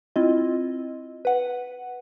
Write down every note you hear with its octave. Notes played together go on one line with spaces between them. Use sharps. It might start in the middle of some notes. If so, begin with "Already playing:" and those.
C4 E4 F4 D#5
B4 F#5